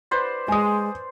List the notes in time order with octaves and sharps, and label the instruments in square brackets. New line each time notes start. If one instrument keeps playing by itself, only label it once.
[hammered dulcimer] B4 C5 D5
[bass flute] G#3 [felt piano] G#5 D#6